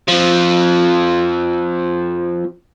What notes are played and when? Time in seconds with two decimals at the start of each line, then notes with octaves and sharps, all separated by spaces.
0.08 F3 C4